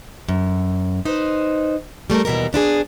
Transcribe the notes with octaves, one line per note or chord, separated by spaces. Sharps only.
F#2
D#4 B4 C5
G3 A3 A4 A#4
D#2 B2 E3 G3 A#4
B3 D4 E4 G#4